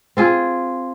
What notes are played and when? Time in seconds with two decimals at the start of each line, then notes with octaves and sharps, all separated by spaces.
0.17 C4 F4 G#4